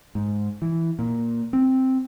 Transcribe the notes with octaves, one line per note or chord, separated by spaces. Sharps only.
G#2
E3
A#2
C4